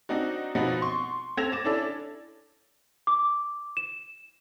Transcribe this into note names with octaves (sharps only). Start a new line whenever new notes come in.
C4 D4 D#4 F#4
B2 F3 B3 C4 D#4 F#4
C6 C#6
C4 A4 G#6 A#6 E7 F7
D6 A6 E7
C#4 D4 E4 A4 D5
D6
E7